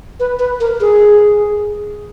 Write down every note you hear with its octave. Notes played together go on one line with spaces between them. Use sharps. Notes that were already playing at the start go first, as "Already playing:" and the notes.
B4
B4
A#4
G#4